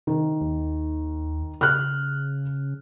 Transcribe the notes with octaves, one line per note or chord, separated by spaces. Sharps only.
C3 D#3
D#2
C#3 F6 F#6